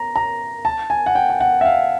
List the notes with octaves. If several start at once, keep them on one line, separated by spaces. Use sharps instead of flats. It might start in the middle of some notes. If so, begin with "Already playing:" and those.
Already playing: A#5
A#5
A5
G#5
F#5
G5
G5
F#5
E5
F5